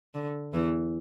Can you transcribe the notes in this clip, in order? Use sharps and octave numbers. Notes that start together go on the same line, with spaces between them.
D3
E2 E3